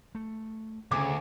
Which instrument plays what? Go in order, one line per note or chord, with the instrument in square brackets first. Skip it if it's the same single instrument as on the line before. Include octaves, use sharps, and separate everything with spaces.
[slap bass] A3
[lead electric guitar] D2 [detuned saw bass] C#3 [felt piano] D6